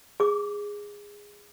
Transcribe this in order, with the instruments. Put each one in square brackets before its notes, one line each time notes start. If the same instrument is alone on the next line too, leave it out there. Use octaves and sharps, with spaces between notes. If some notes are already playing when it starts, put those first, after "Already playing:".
[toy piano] G#4 D6